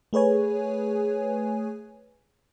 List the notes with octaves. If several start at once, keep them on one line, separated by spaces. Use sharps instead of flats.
A3 G#4 B4 C#5 G#5